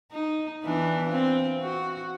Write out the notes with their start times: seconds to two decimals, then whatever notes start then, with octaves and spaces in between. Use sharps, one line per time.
0.12 D#4
0.64 E3 B3 D4
1.10 C4 F4
1.62 F#4